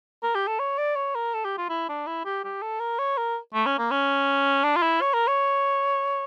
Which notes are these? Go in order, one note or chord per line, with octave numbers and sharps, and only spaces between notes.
A#4
G4
A4
C#5
D5
C#5
A#4
A4
G4
F4
E4
D4
E4
G4
G4
A4
A#4
C#5
A#4
A3
C#4
A#3
C#4
D4
F4
E4
C#5
A#4
C#5